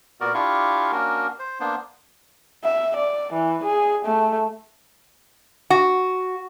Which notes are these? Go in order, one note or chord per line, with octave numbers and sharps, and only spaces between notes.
A#2 B3 F#4 A#4 D5
D4 E4 F4 G4 F5 C#6
A#3 C#4 D4 F#4 A#4
C5
A#3 B3 D4 C5
E5
D5
E3
G#4
A3
F#4